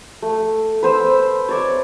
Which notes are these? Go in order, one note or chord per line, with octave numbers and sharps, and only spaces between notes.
A3
B4 C5 E6
C#5 D5 E5